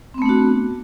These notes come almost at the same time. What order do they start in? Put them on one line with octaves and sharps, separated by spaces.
C4 B3 A3 D4 F#4